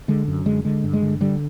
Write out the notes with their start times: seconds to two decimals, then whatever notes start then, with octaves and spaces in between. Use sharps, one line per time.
0.08 D3 G#3
0.28 F#2
0.46 D3 G#3
0.65 D3 G#3
0.84 G2
0.93 G#3
1.02 D3
1.20 D3 G3